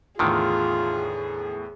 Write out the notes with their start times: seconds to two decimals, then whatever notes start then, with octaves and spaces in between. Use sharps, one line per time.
0.19 E2 A2 D3 D#3 F4 G#4